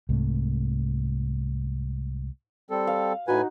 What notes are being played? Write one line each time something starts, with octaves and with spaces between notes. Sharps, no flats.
C2 G#2 C3 A3
G3 C4 A4
F5
A2 D#4 F#4 B4 G#5